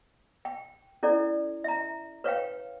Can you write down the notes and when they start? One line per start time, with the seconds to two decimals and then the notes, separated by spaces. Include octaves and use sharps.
0.45 G5
1.03 C#4 E4 A4 D5
1.64 E5 A#5
2.24 B4 C#5 F5 G5